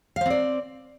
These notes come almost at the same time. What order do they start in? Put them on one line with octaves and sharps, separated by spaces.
F5 C5 C4 D5